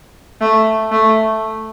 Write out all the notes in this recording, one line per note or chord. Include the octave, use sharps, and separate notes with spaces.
A3
A3